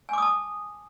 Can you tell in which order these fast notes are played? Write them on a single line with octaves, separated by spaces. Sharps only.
G#5 D6 D#6 A5